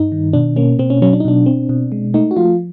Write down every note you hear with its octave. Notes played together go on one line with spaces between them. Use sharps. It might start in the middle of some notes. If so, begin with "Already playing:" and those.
Already playing: G2 D#4
D#3
B2 D4
A#3 C#4
B2 C4
C#4
F#3 C#4
D4
D#4
B2 D4
C4
B2
G#3
A3 D#4
F#4
F3 F4